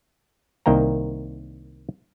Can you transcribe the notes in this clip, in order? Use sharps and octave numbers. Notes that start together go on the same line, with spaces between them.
C2 D#3 A#3 G5 A#5